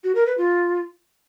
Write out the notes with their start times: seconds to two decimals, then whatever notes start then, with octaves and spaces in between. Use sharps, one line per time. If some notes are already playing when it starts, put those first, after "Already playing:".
0.04 F#4
0.15 A#4
0.26 B4
0.38 F4